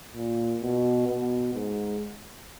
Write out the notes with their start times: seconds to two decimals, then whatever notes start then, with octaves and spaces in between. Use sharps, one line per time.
0.13 A#2
0.61 B2
1.07 B2
1.54 G#2